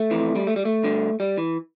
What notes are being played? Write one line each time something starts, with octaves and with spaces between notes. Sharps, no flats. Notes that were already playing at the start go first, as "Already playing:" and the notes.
Already playing: A3
F2 E3
G3
A3
G3
A3
G2 D3
G3
E3